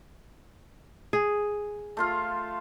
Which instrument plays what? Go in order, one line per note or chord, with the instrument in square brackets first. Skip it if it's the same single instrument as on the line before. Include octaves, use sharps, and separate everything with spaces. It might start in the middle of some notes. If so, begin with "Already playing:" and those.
[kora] G#4
[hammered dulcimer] A3 F4 F5